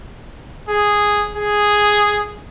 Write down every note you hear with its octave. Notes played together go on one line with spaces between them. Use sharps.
G#4
G#4